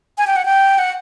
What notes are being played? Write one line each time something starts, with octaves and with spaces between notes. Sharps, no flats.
G#5
G5
F#5
G5
F#5